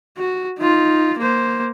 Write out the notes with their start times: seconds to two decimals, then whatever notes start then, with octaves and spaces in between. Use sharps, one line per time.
0.17 F#4
0.59 D#4 F4
1.18 A#3 C5